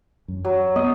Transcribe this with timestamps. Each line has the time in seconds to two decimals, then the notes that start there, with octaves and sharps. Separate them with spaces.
0.28 F#2
0.45 F#3
0.76 B3 D#5